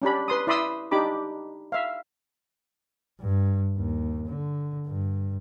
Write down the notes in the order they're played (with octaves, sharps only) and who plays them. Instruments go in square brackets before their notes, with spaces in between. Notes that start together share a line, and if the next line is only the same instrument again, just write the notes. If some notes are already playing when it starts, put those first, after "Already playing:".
[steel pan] C#4 D4 G4 B5
B4 C6 D#6
E4 D5 B5 C6 D#6 E6
D4 D#4 G4 B5 D6
E5 F5
[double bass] G2
D#2
D3
G2